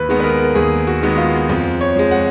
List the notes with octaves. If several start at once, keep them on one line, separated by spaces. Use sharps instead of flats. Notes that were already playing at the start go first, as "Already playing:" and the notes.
Already playing: D#2 B4
D#3 G#3 B3
B4
A#4
D#2 G#4
F#4
D#3 G#3 B3
F4
F2 F4
C#5
F3 G#3
F#5